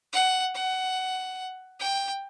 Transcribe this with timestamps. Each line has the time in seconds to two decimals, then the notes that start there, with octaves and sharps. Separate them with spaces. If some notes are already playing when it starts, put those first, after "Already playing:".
0.13 F#5
0.55 F#5
1.80 G5